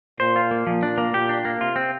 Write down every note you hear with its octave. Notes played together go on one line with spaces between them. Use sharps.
A#2 C5
F4
A#3
A#2 F3
D4
A#3
A#2 G4
D4
A#3
C3 F4
C4